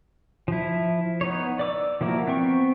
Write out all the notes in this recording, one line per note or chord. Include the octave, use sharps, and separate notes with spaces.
F3 E4
B3 D#4 C#5
D5 D6 E6
F3 A#3 E4 F#4 A#4
B3 C4 G5 C#6